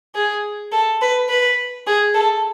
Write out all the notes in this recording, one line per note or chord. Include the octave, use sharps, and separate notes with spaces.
G#4
A4
B4
B4
G#4
A4